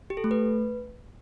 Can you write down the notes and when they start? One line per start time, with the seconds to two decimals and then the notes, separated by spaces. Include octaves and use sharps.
0.10 G4
0.17 A4
0.24 A3
0.31 B4